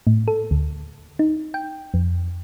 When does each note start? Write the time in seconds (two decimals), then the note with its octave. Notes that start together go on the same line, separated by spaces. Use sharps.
0.07 A2
0.28 A4
0.51 D2
1.19 D#4
1.54 G5
1.94 F2